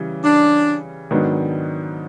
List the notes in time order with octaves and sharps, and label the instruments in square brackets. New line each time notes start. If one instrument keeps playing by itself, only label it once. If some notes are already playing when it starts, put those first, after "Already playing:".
Already playing: [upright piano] C#3 E3 G3
[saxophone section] D4
[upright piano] G#2 D#3 F#3 B3 D4